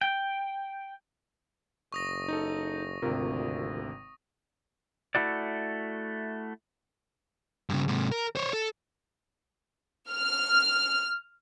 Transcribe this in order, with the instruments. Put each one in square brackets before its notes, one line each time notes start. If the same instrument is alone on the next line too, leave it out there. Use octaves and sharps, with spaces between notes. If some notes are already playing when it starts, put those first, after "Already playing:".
[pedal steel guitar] G5
[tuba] F#1 [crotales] C#6 D#6 A#6
[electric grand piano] D#4 A4
[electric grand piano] G#1 C3 [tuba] D2 [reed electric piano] F4 G4 A#4
[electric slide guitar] A3 E4 F#4 D5
[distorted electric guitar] G2 C#3
G#2 C3
A#4
C5 C#5
A4
[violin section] F6